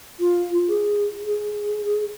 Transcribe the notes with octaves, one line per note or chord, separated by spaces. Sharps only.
F4
G#4
G#4